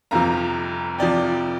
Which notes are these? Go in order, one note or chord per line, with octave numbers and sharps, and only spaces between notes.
G1 F2 C3 F3 F5 A#5
C3 F3 D5 G5